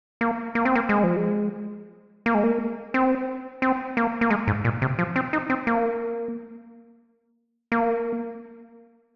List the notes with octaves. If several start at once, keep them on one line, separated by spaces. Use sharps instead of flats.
A#3
A#3
C4
A#3
G#3
F3
G#3
A#3
G#3
A#3
C4
C4
A#3
A#3
G#3
G#2
A#2
C3
F3
C4
D#4
C4
A#3
A#3